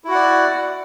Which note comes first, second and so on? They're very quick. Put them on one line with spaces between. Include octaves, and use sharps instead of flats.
E4 F#4 F#5 D5